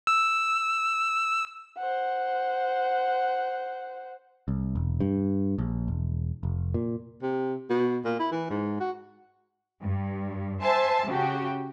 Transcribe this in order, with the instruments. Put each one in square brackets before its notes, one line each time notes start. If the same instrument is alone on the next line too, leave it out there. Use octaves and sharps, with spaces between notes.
[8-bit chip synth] E6
[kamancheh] C5 F#5
[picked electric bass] C2
E1
G2
A#1
E1
F1
A#2
[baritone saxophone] C3
B2
A#2
E4
E3
G#2
F#4
[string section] G2
C5 E5 G#5 A5
C#3 F#4 G4